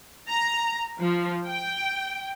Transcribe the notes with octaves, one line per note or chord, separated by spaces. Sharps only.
A#5
F3
G5